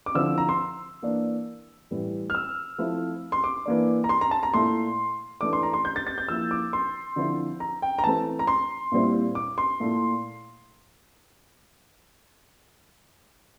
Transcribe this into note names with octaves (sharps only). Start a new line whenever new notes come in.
D6
D3 F3 C4 E4 E6
A#5
C6
E3 A#3 D4
A2 E3 G3
F6
E6
F3 A3 C4 E4
C6
D6
E3 A#3 D4
A#5
C6
A#5
A5
A#5
A#2 A3 E4 C6
E3 A3 D4 D6
C6
A#5
C6
G6
A6
A6
G6
F3 A#3 E4 E6
D6
C6
D3 F3 C4 E4
A#5
G5
A#5
E3 A3 C4 A5
A#5
C6
A#2 G3 C4 E4
D6
C6
A#2 A3 E4